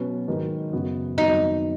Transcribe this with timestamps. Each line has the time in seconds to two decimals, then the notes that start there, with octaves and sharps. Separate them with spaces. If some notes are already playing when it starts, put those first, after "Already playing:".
Already playing: B2 F#3 C#4 B4
0.28 G#2 D#3 F#3 D#4 B4
0.72 F#2 C#3 B3 F#4 B4
1.18 G#1 F#2 F#3 B3 D#4 F#4